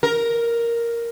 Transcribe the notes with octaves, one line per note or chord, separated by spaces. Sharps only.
A#4